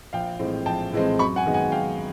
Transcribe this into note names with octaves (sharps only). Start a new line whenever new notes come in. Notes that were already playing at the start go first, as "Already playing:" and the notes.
A#1 F5 G5
A2 E3 G#3 C4
A#1 G5 A5
A2 E3 G#3 C4
F#2 B5 C#6
F#5 G#5
D#3 G#3 B3
F#5 G#5
F#2 F5 G5